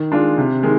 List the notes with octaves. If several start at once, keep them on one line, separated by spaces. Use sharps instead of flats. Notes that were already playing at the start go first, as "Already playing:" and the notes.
Already playing: D#3
G#3 D4 F4
C3
D#3 G#3